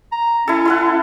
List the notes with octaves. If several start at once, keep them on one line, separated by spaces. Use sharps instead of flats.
A#5
C#4 E4 A4
E4 A4 F#5